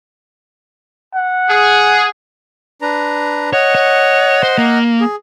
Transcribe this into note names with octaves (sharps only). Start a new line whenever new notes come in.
F#5
G#4
D4 B4 A#5
C#5 D#5 F#5
C#5
C5
A#3
G#4